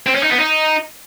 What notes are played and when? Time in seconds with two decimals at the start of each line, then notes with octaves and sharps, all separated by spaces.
0.07 C4
0.15 C#4
0.23 D#4
0.31 B3
0.40 D#4